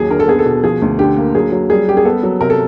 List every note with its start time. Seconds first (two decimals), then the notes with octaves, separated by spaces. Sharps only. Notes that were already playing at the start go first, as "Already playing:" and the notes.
Already playing: D#2 F#3 G#4
0.10 D3 A#4
0.20 A4
0.28 B3 G#4
0.39 A4
0.45 B2
0.63 F3 G#4
0.82 D2
0.99 D3 G4
1.17 A#3
1.34 F#3 G#4
1.52 F#3
1.70 G3 G#4
1.88 G3 G4
1.97 G#4
2.05 B3 A4
2.23 F#3
2.41 C3 A#4
2.50 A4